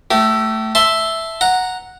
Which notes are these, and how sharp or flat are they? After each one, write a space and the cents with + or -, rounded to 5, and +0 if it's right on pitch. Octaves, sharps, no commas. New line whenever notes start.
A3 +5 G4 -35
E5 +0 A5 +0 C6 +0
F#5 -5 A#5 +0